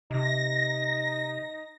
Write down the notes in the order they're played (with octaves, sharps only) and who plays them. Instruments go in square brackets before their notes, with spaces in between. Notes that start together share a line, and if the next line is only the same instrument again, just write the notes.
[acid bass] C3 [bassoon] D#4 [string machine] A#6